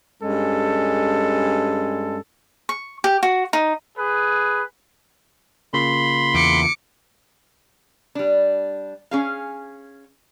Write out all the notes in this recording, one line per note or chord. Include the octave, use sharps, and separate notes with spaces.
G2 G#3 C#4 A4
C#6
G4
F#4
D#4
G#4 B4
C#3 A#3 F4 B5 C6
E2 D6 C#7
G3 D4
C#4 G#4 F5